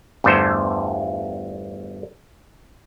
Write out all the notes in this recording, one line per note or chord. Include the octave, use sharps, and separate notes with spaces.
G1 E2 D3 A3 C5